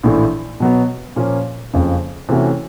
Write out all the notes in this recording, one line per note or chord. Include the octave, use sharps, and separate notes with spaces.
A#1 A2 E3 A3
B2 F#3 B3
A#2 F3 A#3 C#4
F#1 F2 C#3
C3 E3 A3 C#4 F#4